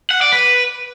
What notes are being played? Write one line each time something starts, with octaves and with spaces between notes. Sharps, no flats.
F#5
D5
B4